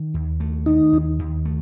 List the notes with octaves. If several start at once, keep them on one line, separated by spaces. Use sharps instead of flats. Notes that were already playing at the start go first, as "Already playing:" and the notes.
Already playing: D#3
D#2
A3
D#3 D#4
D#2
D#2
A3